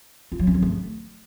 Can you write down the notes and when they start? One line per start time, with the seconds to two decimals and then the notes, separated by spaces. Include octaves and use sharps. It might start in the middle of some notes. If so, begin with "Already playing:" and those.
0.32 F4
0.39 F#3
0.47 C#4
0.55 F#3
0.62 A3